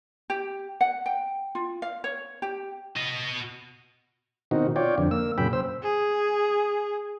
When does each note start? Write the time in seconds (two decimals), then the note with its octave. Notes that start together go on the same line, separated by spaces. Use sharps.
0.30 G4
0.81 F#5
1.06 G5
1.55 F4
1.82 F5
2.04 C#5
2.42 G4
2.96 F#4 D#5
4.51 B2 D#3 C4 D#4 F#4
4.76 F4 C#5 D5 G5
4.98 F2 D3
5.11 A#3 E6
5.38 F#2 A#2 C#3 G5 B5
5.53 C5 E6
5.83 G#4